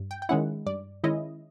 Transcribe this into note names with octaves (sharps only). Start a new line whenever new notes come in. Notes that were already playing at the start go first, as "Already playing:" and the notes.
Already playing: G2
G5
G5
D#3 G#3 C#4 E4 F#5
G2 D5
D#3 G#3 C#4 E4 D#5